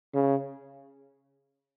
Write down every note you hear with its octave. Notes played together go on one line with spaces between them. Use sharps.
C#3